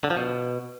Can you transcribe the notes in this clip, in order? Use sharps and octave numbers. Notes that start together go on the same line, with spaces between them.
D3
F3
B2